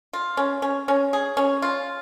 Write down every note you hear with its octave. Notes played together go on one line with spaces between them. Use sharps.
F4
C#4
C#4
C#4
G#4
C#4
F4